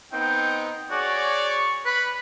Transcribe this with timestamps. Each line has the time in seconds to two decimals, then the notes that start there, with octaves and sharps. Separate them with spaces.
0.13 B3 C4 D#4 G5
0.91 F#4 G#4 C#5 D5
1.49 C#6
1.86 B4 B5